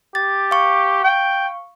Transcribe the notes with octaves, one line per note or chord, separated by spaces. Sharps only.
G4 A6
F5 C#6
G5